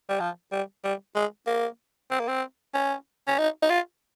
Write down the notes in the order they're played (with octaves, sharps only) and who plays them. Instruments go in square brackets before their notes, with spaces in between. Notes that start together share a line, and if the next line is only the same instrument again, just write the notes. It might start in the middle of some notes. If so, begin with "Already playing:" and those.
[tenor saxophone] G3
F3
G3
G3
G#3
A#3
C4
A#3
C4
C#4
C#4
D#4
D#4
F4